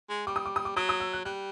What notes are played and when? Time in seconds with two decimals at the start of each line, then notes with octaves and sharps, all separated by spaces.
0.09 G#3
0.27 G3 D6
0.36 D#6
0.46 D6
0.56 D#6
0.65 D6
0.76 F#3 D#6
0.89 D#6
1.00 E6
1.13 F#6
1.25 G3 F#6